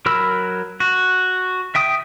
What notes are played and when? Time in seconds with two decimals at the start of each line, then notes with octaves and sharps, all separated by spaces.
0.06 F#3 A#4 B5 E6
0.80 F#4
1.75 E5 G5 D#6